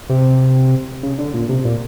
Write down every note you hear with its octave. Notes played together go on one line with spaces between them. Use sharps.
C3
C#3
D3
A#2
C3
A#2